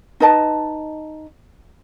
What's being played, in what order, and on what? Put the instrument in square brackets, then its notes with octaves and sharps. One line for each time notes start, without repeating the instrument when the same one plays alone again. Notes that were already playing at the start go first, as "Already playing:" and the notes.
[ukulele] D#4 B4 D#5 A5